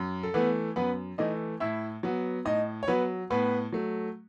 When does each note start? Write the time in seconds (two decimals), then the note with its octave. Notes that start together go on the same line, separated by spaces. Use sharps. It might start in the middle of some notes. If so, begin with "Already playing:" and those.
Already playing: F#2
0.23 A4
0.34 E3 A3 B3 B4
0.76 F#2 B3 B4
1.18 E3 A3 D#4 D#5
1.60 A2 E4 E5
2.03 F#3 B3
2.45 A2 D#4 D#5
2.83 C#5
2.88 F#3 B3 B4
3.30 A2 B3 B4
3.72 F#3 A3